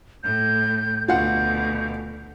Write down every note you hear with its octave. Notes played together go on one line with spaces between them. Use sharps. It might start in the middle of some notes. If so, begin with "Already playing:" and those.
A2 G6
D2 B2 F4 F5 F#5 G6